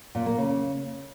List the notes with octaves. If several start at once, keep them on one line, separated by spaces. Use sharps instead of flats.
A#2
A#3
C#3